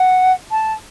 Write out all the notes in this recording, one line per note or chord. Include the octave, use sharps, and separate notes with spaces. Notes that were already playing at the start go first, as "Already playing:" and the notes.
Already playing: F#5
A5